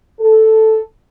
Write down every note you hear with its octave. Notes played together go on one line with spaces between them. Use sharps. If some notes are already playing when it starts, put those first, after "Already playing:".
A4